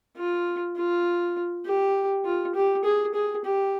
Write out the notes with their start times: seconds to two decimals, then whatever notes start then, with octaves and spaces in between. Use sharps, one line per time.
0.16 F4
0.76 F4
1.65 G4
2.25 F4
2.55 G4
2.84 G#4
3.14 G#4
3.44 G4